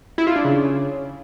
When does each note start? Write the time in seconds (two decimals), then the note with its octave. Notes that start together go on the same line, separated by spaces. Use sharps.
0.18 E4
0.27 F4
0.36 D4
0.45 C#3